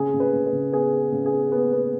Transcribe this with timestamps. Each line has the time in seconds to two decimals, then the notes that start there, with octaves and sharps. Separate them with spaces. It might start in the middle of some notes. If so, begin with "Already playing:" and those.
Already playing: C#3 G#4
0.14 C#3
0.20 B4
0.33 C#3
0.46 B4
0.52 C#3
0.72 B3 G#4
0.93 B3
1.12 C#3
1.26 G#4
1.32 B3
1.52 B3
1.73 B3